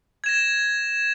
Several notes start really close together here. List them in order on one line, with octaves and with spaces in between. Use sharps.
G#6 E7 A#6